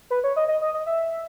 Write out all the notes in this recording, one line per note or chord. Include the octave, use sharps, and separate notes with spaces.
B4
C#5
D#5
D#5
D#5
D#5
E5